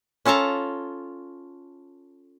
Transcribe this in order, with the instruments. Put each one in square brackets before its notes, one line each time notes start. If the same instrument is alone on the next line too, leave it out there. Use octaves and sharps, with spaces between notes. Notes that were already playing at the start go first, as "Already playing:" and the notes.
[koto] C#4 F4 A4 A5 A#5